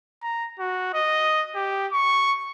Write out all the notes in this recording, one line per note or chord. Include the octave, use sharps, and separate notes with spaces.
A#5
F#4
D#5
G4
C#6